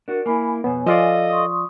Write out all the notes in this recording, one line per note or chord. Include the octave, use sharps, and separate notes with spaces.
D4 F#4 A#4
A#3 E4 G#5 B5
F2 B2 B3 C#5 G#5
F3 F4 A4 D5 D#5 F5
C6 C#6 D#6